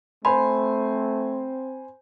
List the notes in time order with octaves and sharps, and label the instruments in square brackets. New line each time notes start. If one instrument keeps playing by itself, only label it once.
[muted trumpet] A3 [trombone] C4 [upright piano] C5 G#5 [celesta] B5 C6